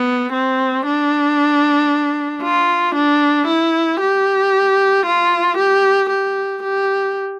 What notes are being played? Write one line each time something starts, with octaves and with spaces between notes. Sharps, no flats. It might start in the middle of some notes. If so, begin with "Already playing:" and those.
Already playing: B3
C4
D4
F4
D4
E4
G4
F4
G4
G4
G4